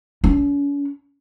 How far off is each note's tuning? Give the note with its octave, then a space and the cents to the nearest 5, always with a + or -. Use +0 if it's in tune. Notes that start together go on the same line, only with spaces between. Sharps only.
C#4 +40